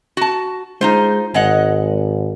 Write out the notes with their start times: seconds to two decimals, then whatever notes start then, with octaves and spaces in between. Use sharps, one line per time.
0.17 F#4 A5
0.81 G#3 D#4 F4 C5
1.34 G#1 G#3 D#5 F#5